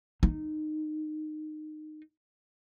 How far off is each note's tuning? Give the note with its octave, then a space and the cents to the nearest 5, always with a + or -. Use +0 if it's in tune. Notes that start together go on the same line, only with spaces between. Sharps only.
D#4 -20